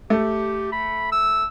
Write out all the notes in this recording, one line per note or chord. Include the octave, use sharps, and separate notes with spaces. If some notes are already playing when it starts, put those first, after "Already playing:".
A3 G4
B5
E6